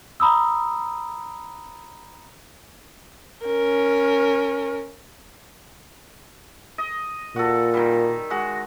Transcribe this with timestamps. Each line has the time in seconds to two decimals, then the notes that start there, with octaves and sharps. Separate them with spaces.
0.20 A#5 B5 D#6 E6
3.45 C#4 A#4
6.78 D#5
7.36 A#2 F#4 A4
7.74 D#3 G3
8.30 G#3 F#4